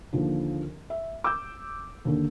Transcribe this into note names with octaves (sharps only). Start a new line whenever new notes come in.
D#2 D3 D#3 F3
E5
D6 E6 G6
D#2 D3 D4